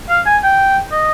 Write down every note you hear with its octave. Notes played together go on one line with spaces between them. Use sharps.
F5
G#5
G5
D#5